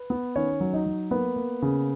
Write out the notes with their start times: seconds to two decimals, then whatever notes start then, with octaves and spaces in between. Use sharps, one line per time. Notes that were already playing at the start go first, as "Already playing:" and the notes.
Already playing: B4
0.10 B3
0.36 D#3 C#4 C#5
0.60 F#3
0.73 D#4 D#5
0.86 F#3
1.11 A#3 B3 B4
1.36 A#3
1.62 C#3